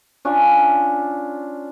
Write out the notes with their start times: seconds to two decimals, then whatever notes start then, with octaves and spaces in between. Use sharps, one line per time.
0.25 C#4 D4 F4 C#6